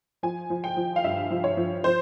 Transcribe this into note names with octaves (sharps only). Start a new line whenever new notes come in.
F3 G#5
F3
G5
F3
F5
G2 E5
F3
C#5
F3
F3 C5